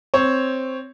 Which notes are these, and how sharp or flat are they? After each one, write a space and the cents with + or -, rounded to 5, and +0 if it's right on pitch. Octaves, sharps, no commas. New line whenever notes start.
C4 +0 C#5 +0